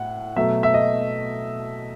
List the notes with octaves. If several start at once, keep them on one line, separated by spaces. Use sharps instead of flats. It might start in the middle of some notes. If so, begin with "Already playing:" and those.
Already playing: A2 F#5
B2 F#3 A3 E5
E5
D#5